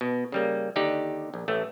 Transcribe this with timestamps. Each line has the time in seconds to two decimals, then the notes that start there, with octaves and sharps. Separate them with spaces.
0.01 B2
0.32 C#3 G3 A#3
0.76 D#2 D3 D#4 G4 D5
1.34 A#1
1.48 A1 A3